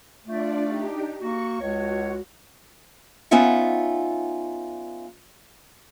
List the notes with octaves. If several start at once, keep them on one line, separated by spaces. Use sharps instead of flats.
A3 D4 F4 D5
D4 D#4 G4
A#3 F#4 C#6
C#2 F#4 C#5
B3 C#4 D#4 F4 E5 F#5